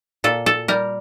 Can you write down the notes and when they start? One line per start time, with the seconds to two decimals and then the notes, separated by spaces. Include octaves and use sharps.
0.24 A#2 A4
0.46 A4
0.68 G3 A#4